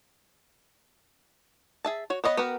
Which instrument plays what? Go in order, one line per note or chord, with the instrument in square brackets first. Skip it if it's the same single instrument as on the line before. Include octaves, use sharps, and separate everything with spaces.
[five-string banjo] G#4 E5 A5
F#4 C#5
B3 C#5 D#5 B5
B3 F#4 G4 A#4 B4